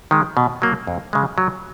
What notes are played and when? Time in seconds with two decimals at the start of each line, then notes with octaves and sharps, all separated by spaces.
0.11 D#3 G#3
0.37 B2
0.62 F#3 A#3
0.87 F2
1.13 C#3 G#3
1.38 F#3